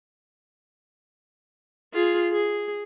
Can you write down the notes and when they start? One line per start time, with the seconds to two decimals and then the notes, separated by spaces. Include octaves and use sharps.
1.93 F4 G#4
2.31 G#4